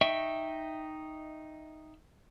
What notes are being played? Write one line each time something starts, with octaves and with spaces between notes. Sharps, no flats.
D#4 D#5 E5 G5 C#6